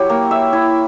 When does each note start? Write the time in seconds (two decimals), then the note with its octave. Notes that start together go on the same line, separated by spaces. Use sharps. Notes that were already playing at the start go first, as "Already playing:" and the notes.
Already playing: F#3 E4 G4
0.10 A#3
0.31 E5
0.53 E4